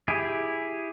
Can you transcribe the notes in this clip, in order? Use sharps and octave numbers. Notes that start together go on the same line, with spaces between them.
E4 G4 G#4